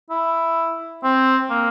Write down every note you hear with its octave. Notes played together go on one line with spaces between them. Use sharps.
E4
C4
A#3